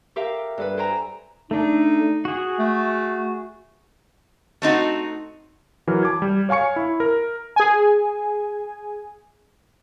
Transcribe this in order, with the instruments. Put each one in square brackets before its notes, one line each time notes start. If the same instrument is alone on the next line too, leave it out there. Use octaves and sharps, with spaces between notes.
[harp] G4 A4 A#4 E5 F5 G5
G2 A4 B4
A4 C5 G5 G#5 A#5
[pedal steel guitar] A3 D4 [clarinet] D#4
[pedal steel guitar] F#4 G#4
[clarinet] A3
[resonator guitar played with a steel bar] A3 C4 D#4 F#4
[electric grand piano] E3 F#3 A#4 F6
A5 D6 G#6
G3
C#5 F5 G#5 C#6 C#7
E4
A#4
[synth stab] G#4 G#5